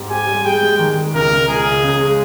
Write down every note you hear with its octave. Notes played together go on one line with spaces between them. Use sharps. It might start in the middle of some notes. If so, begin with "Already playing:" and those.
Already playing: G#2 C4 G4
G4 G#5
G3
G#3 G5
G#3
D#3
G#3
C#2 A#4
C#2
C#2 G#4
C#2
C#3
G#3